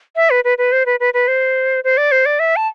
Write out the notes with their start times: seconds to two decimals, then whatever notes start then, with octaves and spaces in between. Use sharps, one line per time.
0.16 E5
0.30 B4
0.44 B4
0.58 B4
0.72 C5
0.86 B4
1.00 B4
1.14 B4
1.28 C5
1.84 C5
1.97 D5
2.12 C5
2.26 D5
2.39 E5
2.56 A5